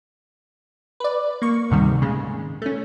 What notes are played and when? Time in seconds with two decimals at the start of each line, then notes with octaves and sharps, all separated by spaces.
1.00 B4 D5
1.42 A#3 C#6
1.70 D2 G#2 C3 D#3 G3
2.01 A#2 C#3 G#3
2.62 A3 C#4